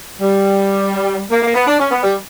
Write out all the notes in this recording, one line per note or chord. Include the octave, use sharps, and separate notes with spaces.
G3
A#3
A#3
B3
D4
C#4
B3
G3